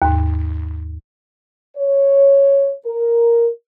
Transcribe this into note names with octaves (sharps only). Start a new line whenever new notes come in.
D#2 G#2
C#5
A#4